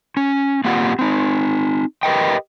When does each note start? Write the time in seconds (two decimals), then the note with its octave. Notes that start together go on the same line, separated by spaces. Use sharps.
0.17 C#4
0.64 A#3 C4 F4 G4 F#5
0.99 C4 D#4
2.03 G4 A#4 B4 D#5 G5